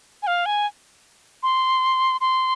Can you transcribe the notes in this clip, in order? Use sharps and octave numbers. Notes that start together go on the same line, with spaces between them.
G#5
F5
G#5
C6
C6